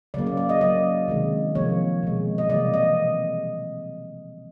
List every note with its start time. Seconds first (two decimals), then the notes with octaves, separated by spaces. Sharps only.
0.14 C#3 F#3 A#3 D5
0.27 D5
0.37 D5
0.49 D#5
0.61 C#3 F#3 A#3 D5
1.08 C3 D#3 G#3
1.55 C3 F3 A#3 C#5
2.03 B2 G#3
2.38 D#5
2.49 C3 E3 G3 A#3 D5
2.74 D#5